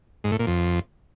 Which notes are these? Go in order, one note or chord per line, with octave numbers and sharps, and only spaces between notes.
G#2
A2
A#2
F2